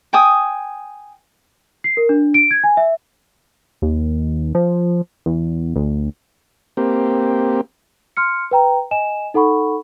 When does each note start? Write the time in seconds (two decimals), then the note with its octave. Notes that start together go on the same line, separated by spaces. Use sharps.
0.13 G5 G#5 D#6
1.84 C7
1.97 A#4
2.09 D4
2.34 D7
2.51 G#6
2.64 G#5
2.77 E5
3.82 D#2
4.55 F3
5.26 E2
5.76 D2
6.77 A#3 C4 G4
8.17 C6 F6 C#7
8.51 B4 G5 A#5
8.91 D#5 G#5 E7
9.34 D#4 A4 F#5 B5 C#6